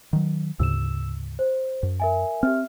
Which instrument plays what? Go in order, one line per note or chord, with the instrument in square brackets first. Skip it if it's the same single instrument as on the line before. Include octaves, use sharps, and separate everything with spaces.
[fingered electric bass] D#3 F#3
[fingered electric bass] D2 G#2 C#3 [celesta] E6 E7
[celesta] C5
[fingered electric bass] F#2
[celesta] A#4 E5 G#5
[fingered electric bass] C4 [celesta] G4 E5 F6